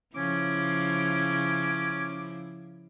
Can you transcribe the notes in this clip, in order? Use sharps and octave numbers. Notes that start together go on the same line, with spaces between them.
C#3 F3 C#4 E4 D6